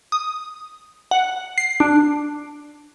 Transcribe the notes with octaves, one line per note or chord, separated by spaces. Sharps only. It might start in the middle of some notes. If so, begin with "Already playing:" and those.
D#6
F#5
C7
D4